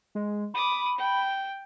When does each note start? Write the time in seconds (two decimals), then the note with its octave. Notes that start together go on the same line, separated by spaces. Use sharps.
0.15 G#3
0.54 B5 D6 D#6
0.98 G5